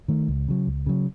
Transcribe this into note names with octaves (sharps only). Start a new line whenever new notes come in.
D#3 A3
C#2
C#3 F#3
C#2
C#3 F#3